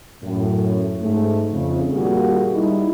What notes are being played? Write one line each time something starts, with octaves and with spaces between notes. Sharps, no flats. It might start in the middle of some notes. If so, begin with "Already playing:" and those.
F#2 A2
G#2 A3
F2 C#3
A#2 D#3 G3 A#3 F#4 G#4
G3 D#4 E4